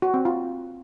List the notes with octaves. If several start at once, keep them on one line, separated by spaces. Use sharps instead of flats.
F#4
C4
F4